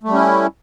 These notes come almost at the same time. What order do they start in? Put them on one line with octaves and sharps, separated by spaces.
A3 G3 C#4 E4